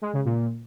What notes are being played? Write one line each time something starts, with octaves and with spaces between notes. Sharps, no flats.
G#3
C#3
A#2